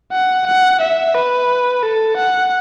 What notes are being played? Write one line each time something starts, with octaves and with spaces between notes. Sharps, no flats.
F#5
F#5
E5
B4
A4
F#5